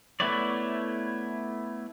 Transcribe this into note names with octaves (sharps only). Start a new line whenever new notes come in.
A3 B3 E4 C#5 D5